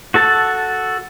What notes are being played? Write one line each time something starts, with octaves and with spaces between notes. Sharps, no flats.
F#4 A4 A5